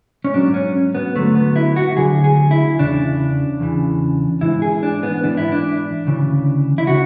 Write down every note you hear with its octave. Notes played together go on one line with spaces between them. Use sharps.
C#4
G#2 F#3 D4
C#4
B3
D2 D3 F#3 A3
B3
E4
F#4
D2 D3 F#3 G#4
G#4
E4
E2 C#3 E3 D4
E2 C#3 E3
G#2 E3 E4
G#4
D4
B3
G#2 E3 D4
E4
D4
D2 C#3 E3
E4
C#3 F#4